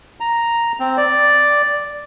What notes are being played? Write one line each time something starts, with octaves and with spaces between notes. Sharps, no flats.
A#5
C4
D5